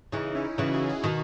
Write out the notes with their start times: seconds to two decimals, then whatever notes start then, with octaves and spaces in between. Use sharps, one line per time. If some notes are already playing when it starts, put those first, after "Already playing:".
0.12 C#3 E3 D#4
0.35 C#4 E4
0.58 C#3 E3 D#4 F#4
0.73 E4 G#4
0.89 E4 G#4
1.04 B2 D#3 D#4 F#4